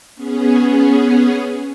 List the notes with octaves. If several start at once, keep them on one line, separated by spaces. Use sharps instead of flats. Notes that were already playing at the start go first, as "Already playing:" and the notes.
B3 C#4 G#4